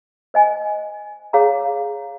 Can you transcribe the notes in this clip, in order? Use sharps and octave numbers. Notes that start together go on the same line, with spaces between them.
C5 D#5 G#5
G#4 C#5 F5 A#5